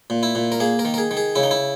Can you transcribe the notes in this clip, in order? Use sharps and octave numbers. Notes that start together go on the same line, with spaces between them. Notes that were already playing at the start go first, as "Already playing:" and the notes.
A#2
E4
A#2
A#4
A#3 G#4
A#4
D#3
A#4
G#4
D#3
G#4
C#3 E4
D#4
E4